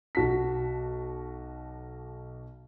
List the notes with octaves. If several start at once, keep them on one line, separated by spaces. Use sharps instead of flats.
B1 F#4 A5 B6